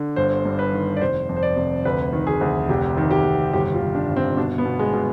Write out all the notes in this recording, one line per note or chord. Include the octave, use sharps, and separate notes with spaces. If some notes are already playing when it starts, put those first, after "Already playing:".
Already playing: D3
G1 C5
G2
B4
D#3
D5
F1 C5
F2
C5
D5
F1
D2 B4
D#3
G#4
D2
F1 G4
D#3
G4
F1
G1 G4
F4
G1
D4
G1
C4
B2 D4
B3
B2
G#3
B2